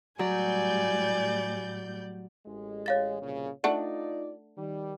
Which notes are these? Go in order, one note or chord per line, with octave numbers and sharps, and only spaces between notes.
A2 F#3 G3 D5 G#5 G6
A1 G#3
C#5 F5 A6
C2 A#2 C#3
A3 D4 D#4 F4 D5 F#5 A5
D#3 G3